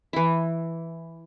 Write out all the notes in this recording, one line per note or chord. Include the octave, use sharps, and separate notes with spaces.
E3 E4